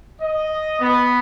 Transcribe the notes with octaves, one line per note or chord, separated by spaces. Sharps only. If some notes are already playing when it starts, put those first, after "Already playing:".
D#5
B3